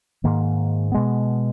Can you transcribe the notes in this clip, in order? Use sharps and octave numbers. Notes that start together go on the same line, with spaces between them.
G#2 D#3 A#3
B2 G#3 B3